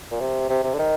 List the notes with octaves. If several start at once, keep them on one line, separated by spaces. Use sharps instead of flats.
A#2
C3
C3
C3
D3
D#3